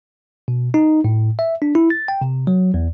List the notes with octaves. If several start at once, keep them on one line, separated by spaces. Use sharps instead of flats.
B2
D#4
A2
E5
D4
E4
A6
G5
C3
F#3
E2